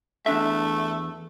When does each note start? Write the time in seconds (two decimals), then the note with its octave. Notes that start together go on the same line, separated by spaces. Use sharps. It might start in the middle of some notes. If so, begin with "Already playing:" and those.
0.26 E2 A3 D4 E5